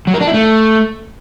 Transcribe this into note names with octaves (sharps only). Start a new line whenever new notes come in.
F#3
A#4
D4
E4
A3